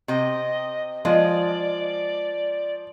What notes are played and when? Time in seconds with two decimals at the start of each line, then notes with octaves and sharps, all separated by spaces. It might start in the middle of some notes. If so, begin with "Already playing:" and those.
0.08 C3 D#5 G5
1.05 F3 G#3 F4 D5 D#5